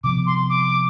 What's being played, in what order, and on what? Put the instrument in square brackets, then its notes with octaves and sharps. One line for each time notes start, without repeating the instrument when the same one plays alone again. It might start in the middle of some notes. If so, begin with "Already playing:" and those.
[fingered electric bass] C3 F3 B3 [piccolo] D6
[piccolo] C6
D6